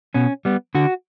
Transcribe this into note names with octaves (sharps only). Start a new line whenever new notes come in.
B2 C#4
G3 B3
D3 F#4